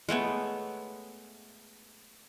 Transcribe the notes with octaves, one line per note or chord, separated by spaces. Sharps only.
G#3 A3 B3 C#5